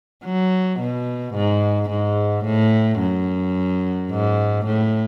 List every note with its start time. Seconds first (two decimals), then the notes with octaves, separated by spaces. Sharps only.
0.25 F#3
0.80 B2
1.35 G#2
1.90 G#2
2.45 A2
3.00 F#2
4.10 G#2
4.66 A2